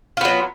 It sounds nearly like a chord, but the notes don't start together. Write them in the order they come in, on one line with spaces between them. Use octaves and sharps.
F4 B3 F#3